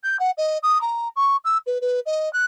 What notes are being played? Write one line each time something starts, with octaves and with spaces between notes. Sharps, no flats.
G6
F#5
D#5
D#6
A#5
C#6
E6
B4
B4
D#5
F#6